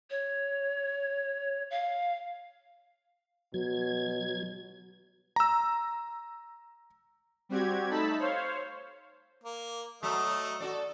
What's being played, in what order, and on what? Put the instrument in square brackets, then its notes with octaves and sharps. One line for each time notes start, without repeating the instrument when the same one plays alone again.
[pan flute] C#5
F5
[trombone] B2 [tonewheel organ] F#3 G#6
[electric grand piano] A#5 E6
[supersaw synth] G3 C4 F#4 G4 G#6
A3 D#4 A5 B5 E6 B6
C5 C#5 F5
[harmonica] A#3
[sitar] F#3 [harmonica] A3 D#5
[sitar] F#4 A4 D5